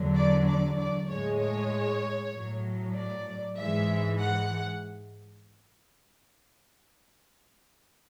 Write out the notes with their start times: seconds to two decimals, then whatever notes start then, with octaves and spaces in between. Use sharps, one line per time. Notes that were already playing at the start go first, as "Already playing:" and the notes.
Already playing: E2 D3 F#3
0.15 D5
0.47 D5
0.78 D5
1.08 A2 G#3 C#5
1.39 C#5
2.32 A2 F#3
2.95 D5
3.57 G#2 E3 G#3 E5
4.19 F#5